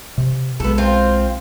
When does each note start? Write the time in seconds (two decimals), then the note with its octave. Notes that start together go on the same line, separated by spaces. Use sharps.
0.18 C3
0.60 B1 G#3 B3 A4
0.78 C4 F4